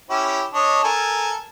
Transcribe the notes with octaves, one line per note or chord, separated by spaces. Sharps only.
C#4 E4 G4
D4 C#5 D#5
A4 A#4 G#5